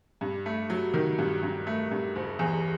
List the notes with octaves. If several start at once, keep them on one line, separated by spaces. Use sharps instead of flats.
G2
A3
F#3
D#3
G2
G2
A3
G2
F#1
E2